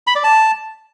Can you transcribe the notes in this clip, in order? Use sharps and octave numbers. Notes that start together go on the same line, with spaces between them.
B5
D5
A5